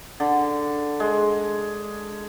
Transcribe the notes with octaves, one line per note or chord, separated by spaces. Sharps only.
D3
G#3